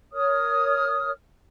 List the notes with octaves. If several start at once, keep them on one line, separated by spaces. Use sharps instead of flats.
A#4 C#5 D#6 F6